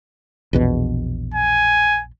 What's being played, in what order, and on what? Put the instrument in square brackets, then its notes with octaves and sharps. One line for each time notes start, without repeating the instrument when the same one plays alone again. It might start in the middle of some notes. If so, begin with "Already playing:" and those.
[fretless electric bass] A#1 E2 B2
[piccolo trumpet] G#5